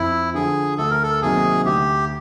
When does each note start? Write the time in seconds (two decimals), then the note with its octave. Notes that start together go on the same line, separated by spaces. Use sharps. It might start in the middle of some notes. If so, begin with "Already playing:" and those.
Already playing: F2 E4
0.34 D3 F3 G#4
0.78 D2 A4
0.90 A#4
1.03 A4
1.22 C3 D#3 F#3 A#3 G#4
1.66 D2 G4